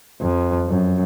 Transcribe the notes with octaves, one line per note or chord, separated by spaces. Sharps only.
F2
F#2